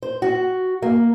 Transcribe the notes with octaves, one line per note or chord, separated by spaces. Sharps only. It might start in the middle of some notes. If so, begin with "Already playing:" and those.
C5
F#4
A#3